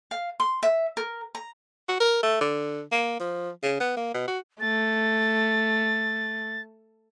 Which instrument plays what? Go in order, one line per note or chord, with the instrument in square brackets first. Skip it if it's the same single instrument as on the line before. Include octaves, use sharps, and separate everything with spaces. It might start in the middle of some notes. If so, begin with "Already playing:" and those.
[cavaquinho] F5
C6
E5
A#4
A#5
[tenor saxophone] F#4
A#4
A3
D3
A#3
F3
C#3
B3
A#3
B2
F#4
[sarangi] A3 [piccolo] A6